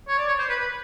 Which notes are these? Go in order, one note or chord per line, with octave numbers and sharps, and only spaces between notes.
C#5
D5
C#5
C5
B4
B4